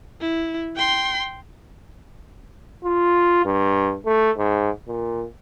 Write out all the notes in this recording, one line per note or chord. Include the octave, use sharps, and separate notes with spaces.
E4
G5 C6
F4
G2
A3
G#2
A#2